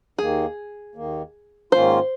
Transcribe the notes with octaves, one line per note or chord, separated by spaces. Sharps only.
D#2 D#3 A#3 G#4
D#2 D#3 A#3
G#2 D#3 A#3 C#4 F4 C5